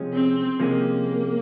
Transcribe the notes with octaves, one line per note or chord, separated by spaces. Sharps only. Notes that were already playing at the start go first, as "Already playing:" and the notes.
Already playing: C3 F3 G#3 C#4
C4
C3 F3 G#3 A#3 C#4